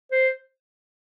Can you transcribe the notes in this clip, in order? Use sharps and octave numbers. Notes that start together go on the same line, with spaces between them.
C5